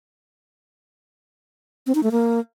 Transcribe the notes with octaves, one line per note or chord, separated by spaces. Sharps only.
C4
D#4
A3
A#3